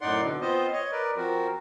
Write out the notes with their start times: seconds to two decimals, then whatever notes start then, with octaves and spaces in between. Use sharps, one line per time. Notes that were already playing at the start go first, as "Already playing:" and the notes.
0.01 F#2 A2 D#4 D5 F#5 C6
0.23 B2 D3
0.41 B3 C4 F4 C5 D#5
0.72 C#5 D#5
0.92 A#4 B4 D5
1.17 F3 C4 F#4 A#4